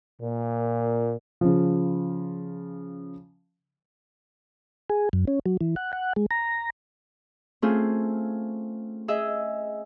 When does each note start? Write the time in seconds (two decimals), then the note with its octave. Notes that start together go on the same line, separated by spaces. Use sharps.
0.22 A#2
1.41 C#3 F3
4.90 G#4
5.13 F#2
5.27 C#4
5.46 F#3
5.61 E3
5.76 F#5
5.93 F#5
6.16 G#3
6.31 A#5
7.62 A3 C4 C#4 F4 G#4
9.08 G#4 D#5 E5